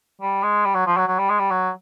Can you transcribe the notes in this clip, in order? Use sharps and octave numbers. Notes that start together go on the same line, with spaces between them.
G3
G#3
G3
F#3
F3
F#3
F#3
G3
G#3
G3
F#3